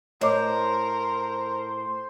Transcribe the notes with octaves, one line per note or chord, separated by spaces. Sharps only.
A2 A#4 C5 C#5 D#5 D6